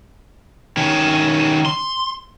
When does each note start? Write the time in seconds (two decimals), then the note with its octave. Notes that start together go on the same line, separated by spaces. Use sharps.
0.77 D#3 C#4
1.66 C6